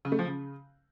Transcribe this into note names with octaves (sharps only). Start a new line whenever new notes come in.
C#3
A3
F3
C#3